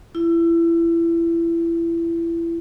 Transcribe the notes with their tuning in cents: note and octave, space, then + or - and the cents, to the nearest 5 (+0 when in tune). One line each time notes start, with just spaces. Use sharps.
E4 +25